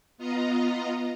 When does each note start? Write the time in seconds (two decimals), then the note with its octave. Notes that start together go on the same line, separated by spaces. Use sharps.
0.18 B3 F4 D#5 A#5